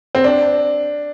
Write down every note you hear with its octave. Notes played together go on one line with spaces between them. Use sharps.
C4
D4